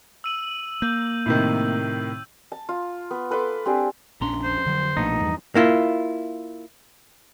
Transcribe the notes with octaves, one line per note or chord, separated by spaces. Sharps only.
E6 D#7 F#7
A#3 G6
A2 C3 D#3
A5
F4
B3
A4 B4 C6 D6
C4 D4 G4 G#4
A#1 F2 C#4 D4 A#5 C6
C5
D3 F#3
B1 A#2 F3 A3 B3 D4 D#4
E2 G2
A#3 E4 F4